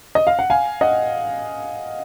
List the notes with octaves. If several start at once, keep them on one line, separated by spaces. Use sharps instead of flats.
D#5
F5
F#5
F5 G#5
D#5 F#5